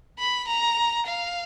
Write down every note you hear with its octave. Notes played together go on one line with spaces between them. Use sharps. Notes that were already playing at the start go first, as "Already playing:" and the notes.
B5
A#5
F5